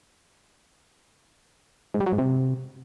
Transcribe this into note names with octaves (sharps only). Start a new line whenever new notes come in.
G#2
G3
F#3
G#2
C3